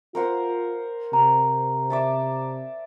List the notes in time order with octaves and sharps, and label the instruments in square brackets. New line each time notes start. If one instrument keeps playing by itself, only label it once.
[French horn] F4 [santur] A#4 C5 F#5
[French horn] C3 [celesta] A#5
[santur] D5 E5 A5